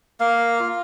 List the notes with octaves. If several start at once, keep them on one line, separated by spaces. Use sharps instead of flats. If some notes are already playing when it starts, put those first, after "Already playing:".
A#3 F5
F4